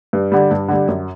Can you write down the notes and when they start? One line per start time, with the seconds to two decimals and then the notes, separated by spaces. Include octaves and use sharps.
0.13 G2
0.32 D3 G3
0.51 G2
0.69 D3 G3
0.88 F#2